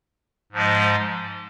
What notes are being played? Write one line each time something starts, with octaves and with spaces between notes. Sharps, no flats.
G#2 F3 G#3